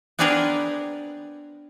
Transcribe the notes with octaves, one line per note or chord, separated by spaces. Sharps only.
B3 C4 D4 G#4 A#4 B4